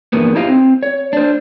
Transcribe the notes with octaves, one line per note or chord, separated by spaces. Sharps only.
E2 G2 A#3 B3
D#4 E4 G4 C5 D#5 F5
C4
C#5
D4 C5